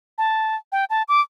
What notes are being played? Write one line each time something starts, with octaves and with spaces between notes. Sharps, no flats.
A5
G5
A5
D6